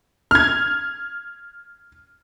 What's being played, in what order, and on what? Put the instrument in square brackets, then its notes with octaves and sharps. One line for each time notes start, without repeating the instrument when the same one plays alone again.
[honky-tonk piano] F6 G#6